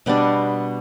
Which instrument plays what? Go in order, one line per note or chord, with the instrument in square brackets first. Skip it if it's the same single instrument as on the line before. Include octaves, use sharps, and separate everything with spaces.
[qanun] B2 G3 B3 D4